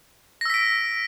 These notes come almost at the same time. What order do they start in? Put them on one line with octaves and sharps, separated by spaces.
A#6 E6 B6 D7